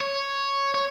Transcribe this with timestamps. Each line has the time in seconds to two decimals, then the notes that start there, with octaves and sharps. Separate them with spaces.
0.01 C#5
0.74 C#5